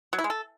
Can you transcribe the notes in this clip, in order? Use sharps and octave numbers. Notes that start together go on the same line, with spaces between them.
F#3
E4
G#3
A4